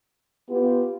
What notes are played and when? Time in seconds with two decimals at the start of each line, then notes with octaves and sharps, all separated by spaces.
0.50 B3 F4 G4